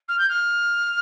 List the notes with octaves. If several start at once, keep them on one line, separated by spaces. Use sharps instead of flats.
F6
G6
F6